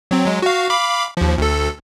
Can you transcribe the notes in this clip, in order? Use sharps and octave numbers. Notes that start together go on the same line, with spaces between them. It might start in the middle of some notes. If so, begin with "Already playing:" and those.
F#3 C4
F#3 G#3
F#4 F5
F5 B5 D6
D#2 F3
D2 A4